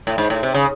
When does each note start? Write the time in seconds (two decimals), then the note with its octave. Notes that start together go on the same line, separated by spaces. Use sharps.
0.07 A2
0.18 G#2
0.30 A2
0.43 C3
0.54 C#3